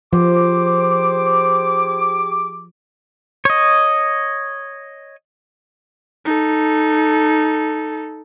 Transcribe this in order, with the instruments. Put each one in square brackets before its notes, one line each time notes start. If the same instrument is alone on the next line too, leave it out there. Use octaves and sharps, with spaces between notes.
[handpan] F3 [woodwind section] G4 G#4 D6 [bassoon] C5
[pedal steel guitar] C#5 D#5
[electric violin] D#4 A4